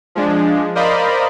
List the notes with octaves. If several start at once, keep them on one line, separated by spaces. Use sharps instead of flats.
F3 G#3 D4
A#4 C5 D5 D#5 F5 B5